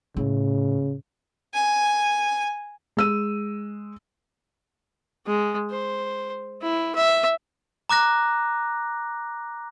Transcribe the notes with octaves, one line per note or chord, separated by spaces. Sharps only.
A2 C#3
G#5
G#3 E6 D#7
G#3
C5
E4
E5
A#5 D6 F#6 A#6